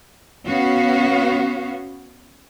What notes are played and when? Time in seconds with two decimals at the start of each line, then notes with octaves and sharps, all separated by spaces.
0.46 B3 C#4 F#4 F5